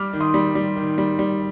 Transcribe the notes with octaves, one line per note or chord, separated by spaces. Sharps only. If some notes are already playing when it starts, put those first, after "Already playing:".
Already playing: G3 D6 F6
D#3
C6 D#6
G3
G3
D#3
G3
G3